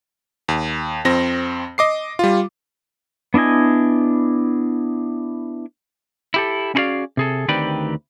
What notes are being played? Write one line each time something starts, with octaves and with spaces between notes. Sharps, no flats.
D#2
F2 C4 A#6
D#5 D6 C7
G3 F4
B3 D4 E4 D#5 G#5
E4 G4 A4
C#4 E4 F#4 G#4 D5 F5
C3 G#4 A4
D2 D#3 C4 G4 B4 D5